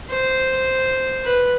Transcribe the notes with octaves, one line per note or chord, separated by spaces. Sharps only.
C5
B4